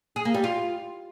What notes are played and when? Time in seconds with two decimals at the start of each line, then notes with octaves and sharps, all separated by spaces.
0.16 G#4
0.25 A#3
0.34 G3
0.44 F4